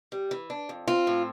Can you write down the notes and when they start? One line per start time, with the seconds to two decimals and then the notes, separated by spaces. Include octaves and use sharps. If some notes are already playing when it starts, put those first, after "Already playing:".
0.12 G3
0.31 E3
0.50 D4
0.69 F2
0.88 C4 F4
1.07 A2